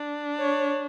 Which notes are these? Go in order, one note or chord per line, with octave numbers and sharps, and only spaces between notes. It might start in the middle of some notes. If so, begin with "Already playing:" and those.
Already playing: D4
C#5